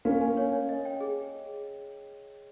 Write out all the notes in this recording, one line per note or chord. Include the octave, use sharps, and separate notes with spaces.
A#3 C#4 F5
G#5
C#5
C#5
D#5
G5
G#4